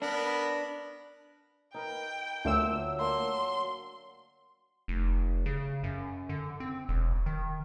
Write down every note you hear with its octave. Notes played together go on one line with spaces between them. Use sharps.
B3 D4 A#4 B5
D#4 A#4 B4 G5
D2 F#3 A3 A#3 F4 E5 F5 E6
A#3 D4 C6
F1
C#3
F#2
D3
C4
E1
D#3